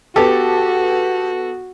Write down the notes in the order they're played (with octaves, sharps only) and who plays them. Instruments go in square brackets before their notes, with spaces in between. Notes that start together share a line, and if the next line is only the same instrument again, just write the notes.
[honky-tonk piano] B3 A4 [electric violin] F#4 [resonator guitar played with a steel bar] G4